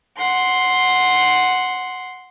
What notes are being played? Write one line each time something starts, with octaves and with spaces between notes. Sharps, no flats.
F#5 C6